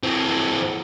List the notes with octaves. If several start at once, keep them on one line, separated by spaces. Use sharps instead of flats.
E3 C4